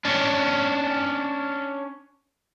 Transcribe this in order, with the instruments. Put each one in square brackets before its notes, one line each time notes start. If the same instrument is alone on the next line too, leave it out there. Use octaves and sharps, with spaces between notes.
[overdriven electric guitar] C#4 D4